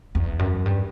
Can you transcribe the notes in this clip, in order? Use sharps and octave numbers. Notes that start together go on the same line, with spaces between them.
E2
F#2
G2